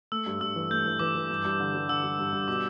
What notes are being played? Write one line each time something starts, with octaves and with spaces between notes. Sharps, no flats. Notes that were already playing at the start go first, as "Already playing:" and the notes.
A3 E6
G2
G2 E6
E3
A3 G6
E3
E3 D6
E3
G2
G2
D3
G3
D3 E6
G2
G2
G2
B2 D6